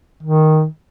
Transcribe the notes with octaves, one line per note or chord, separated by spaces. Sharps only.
D#3